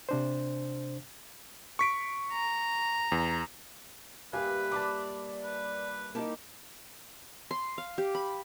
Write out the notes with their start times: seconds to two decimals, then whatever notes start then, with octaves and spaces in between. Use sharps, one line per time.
0.09 C3 D4 C5
1.79 C#6 B6 D7
2.32 A#5
3.12 E2
4.33 G2 A#2 G4 B4 E5 F5 G#5
4.71 D4 A5 B5 D6
5.43 B4
6.15 A#3 D#4 E4 G4 A5
7.51 C6
7.78 F5
7.98 G4
8.15 B5